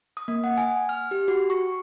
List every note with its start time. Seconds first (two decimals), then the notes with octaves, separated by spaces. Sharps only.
0.17 D#6
0.28 A#3
0.44 F#5
0.57 G#5
0.89 F6
1.11 G4
1.28 F#4
1.50 C#6